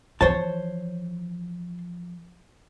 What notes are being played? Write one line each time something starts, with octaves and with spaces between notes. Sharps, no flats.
E3 F3 C5 C#5 A5